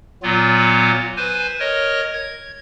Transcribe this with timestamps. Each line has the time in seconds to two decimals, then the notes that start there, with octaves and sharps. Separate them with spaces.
0.23 A#2 F#3 B3 F4
1.17 B4 C5 G#5
1.60 A#4 C#5 D#5
2.13 G#6